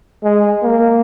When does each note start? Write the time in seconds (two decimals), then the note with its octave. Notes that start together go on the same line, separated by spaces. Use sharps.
0.24 G#3
0.63 A#3